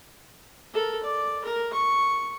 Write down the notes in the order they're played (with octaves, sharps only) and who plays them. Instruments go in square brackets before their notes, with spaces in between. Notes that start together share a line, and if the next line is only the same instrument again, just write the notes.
[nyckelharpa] A4 A#4
D5
A#4
C#6